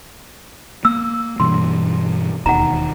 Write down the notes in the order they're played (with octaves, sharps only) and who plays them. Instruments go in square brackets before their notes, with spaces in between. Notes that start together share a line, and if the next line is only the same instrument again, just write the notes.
[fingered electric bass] A#3 [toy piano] E6
[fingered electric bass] G2 B2 E3 [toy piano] C6
[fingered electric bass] E1 D#2 D#3 [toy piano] F#5 A#5